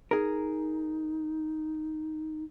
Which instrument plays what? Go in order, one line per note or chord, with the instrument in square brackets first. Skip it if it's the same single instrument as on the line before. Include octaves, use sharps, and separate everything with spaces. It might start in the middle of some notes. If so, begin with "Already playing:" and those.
[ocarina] D#4 [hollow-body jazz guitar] G#4 A#4